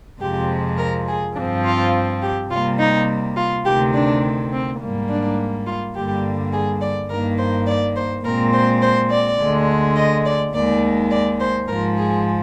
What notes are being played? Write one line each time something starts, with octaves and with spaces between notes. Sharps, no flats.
F2 C3 F3 G#3 G4
A#4
G#4
G2 F3 C4 D4
F4
G4
C3 G3 A#3 F4
D#4
F4
D2 C3 D#3 G4
D4
C4
G#2 G3 A#3
D4
F4
G2 D3 G3 A#3 G4
G#4
D5
G2 D#3 A#3 A#4
C5
D5
C5
A#2 G#3 C4 A#4
C5
C5
D5
D2 D3 G#3
D#5
D5
D#2 D#3 G#3 D5
D5
C5
G#2 F3 G#3 A#4
G#4